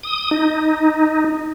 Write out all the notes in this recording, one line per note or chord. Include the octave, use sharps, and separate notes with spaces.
D#6
D#4